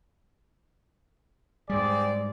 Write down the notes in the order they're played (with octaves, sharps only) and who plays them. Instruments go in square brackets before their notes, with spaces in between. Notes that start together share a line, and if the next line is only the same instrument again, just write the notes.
[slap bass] G#2 G3 [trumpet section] C4 G#4 D5